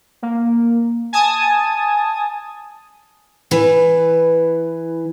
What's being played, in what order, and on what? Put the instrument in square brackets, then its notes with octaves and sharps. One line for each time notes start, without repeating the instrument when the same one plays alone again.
[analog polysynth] A#3
G#5 A5 D#6
[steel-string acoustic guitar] E3 B4